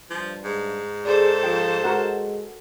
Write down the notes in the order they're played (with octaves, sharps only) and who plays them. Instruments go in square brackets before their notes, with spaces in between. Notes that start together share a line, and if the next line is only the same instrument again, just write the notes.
[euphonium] G2 [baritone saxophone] F3
[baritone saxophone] G#2
[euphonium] G#4 [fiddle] A4 C5 [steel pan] D5
[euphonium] F3 [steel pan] G5
[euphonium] G#3 [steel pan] F#4 A#4 F#5